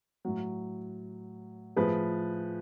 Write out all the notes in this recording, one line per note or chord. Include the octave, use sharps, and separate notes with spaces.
A2 F#3
A2 F3 G#4 B4